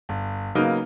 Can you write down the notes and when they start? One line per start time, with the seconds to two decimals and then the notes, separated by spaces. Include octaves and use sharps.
0.09 G1
0.55 C#3 F#3 A#3 B3 D#4